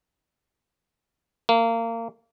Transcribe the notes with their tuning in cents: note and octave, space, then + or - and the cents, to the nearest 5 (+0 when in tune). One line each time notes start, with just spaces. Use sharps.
A#3 -25